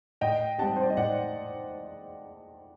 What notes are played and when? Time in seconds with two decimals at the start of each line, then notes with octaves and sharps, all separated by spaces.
0.21 A2 D#5 G5
0.59 G3 C4 G4 F#5 A5
0.76 C5
0.83 D5
0.90 D#5
0.97 A2 D5 F#5